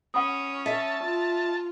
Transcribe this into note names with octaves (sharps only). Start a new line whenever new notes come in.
C#4 F#5 B5 D#6
E5 A5
F4